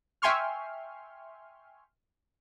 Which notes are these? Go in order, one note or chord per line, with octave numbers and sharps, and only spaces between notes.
E5 G5 G#5 C6 C#6 F6